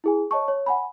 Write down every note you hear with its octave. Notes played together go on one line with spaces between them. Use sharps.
E4 G#4 G#5
C#5 D#5 A5 C#6
C#5
F#5 G#5 B5